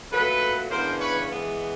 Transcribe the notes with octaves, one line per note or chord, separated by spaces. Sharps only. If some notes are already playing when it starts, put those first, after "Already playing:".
A#2 F#3 A3 A4 B4
C#3 E3 G#3 B3 D4 A#4 C5
B4 C#5
E3 G#3 B3